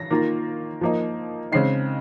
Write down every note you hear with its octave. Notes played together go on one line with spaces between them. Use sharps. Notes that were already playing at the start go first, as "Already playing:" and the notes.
Already playing: A#6
D#3 A#3 F4
F3 A#3 D#4
C#3 G#3 C4 D#4 C7